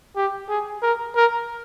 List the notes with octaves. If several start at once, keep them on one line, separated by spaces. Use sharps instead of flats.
G4
G#4
A#4
A#4